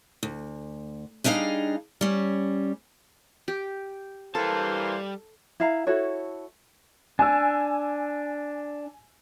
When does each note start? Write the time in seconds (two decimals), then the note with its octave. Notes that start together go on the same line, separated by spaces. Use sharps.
0.23 D2
1.24 G3 D4 D#4 G#4 F5
2.01 G3 C#4
3.48 G4
4.35 E3 G3 A#3 A4 C5 A5
5.60 E4 F5 A#5
5.87 E4 F#4 A4 C#5
7.19 D4 G#5 E6